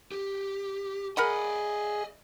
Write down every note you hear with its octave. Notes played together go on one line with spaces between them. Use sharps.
G4
G#4 A#4 D5 D#5 F#5 B5